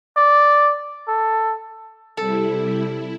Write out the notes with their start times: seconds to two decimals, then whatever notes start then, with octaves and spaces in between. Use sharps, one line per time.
0.16 D5
1.08 A4
2.17 C3 G3 E4 A4
2.84 E4